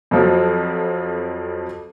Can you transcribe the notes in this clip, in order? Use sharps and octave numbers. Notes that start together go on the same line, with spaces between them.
F2 F3 F#3